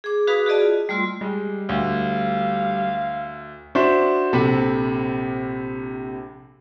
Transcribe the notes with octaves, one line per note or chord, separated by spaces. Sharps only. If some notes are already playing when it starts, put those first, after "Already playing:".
G#4 D6
F#4 G#4 B4 F5 B5 D#6
F#4 G#4 D5 D#5 A5
F4
G3 A3 F4 C6 E6
G3 G#3
D2 F5
D4 F#4 C5 E5 C#6
A#1 C3 A4 B5